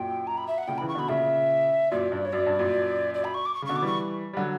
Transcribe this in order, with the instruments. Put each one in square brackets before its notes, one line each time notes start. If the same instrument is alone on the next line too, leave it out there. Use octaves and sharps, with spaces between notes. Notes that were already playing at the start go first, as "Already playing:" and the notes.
Already playing: [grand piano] F#2 A#2 [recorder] G5
[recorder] A#5
B5
E5
F#5
[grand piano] A#2 C#3 [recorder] G5
[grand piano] C#3 E3 [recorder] B5
[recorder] C#6
[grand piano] B2 D3 [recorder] B5
[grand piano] A#2 C#3 [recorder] E5
[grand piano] F#2 A#2 [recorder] D5
[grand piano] G2
[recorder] C#5
[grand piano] F#2 [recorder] D5
[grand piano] G2
F#2 A#2
[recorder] D5
B5
C#6
D6
C#6
[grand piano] C#3
[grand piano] B2 D3 [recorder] C#6
[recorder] D6
[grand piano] E3 G3 [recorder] C#6
[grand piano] G3
D3 F#3